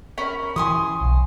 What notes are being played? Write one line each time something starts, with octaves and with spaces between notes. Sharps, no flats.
C#4 A#4 B5
E3 G#5 C6 D#6
B1